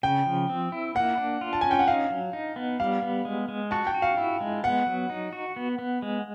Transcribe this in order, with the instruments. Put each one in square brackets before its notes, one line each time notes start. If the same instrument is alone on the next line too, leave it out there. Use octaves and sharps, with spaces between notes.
[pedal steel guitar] C#3 [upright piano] G5
[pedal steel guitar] F3
C4
E4
[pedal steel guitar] A#3 [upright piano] F#5
[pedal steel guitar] D4
F4
[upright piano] A5
[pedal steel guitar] C#4 [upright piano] G#5
[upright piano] G5
F#5
[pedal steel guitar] D#4 [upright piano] F5
[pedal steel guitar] F#3
D#4
B3
[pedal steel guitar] G3 [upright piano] F5
[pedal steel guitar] B3
G#3
G#3
[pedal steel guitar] F#4 [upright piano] A5
[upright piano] G5
[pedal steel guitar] F#4
[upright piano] F5
[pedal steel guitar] E4
G#3
[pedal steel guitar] B3 [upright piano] F#5
[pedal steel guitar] F#3
D#4
F#4
B3
B3
G#3